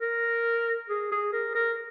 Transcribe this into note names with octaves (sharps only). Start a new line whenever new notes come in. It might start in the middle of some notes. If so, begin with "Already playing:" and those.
A#4
G#4
G#4
A#4
A#4